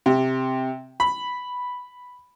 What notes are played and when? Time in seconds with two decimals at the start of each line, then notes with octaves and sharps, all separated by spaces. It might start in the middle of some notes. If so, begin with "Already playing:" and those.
0.06 C3
1.00 B5